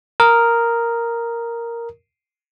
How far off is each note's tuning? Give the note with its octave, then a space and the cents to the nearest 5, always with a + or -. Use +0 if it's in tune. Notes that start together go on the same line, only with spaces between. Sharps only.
A#4 +0 D#6 +10